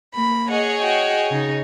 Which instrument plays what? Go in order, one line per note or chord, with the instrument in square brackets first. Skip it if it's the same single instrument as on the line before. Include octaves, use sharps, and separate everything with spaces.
[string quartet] A#3 B5
[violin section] G#4 C#5 D#5 [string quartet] F#5
[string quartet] F#4 G5
C#3 D#4